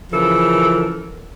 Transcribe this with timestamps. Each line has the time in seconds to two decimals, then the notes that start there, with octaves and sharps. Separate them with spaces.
0.12 C#3 E3 F3 A4 A#4